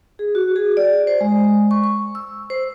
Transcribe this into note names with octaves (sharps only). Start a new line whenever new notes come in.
G#4
F#4
G#4
D5
C5
G#3
C#6
C#6
E6
C5